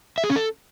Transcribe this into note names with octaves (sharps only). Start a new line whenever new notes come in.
E5
G#4
C#4
A4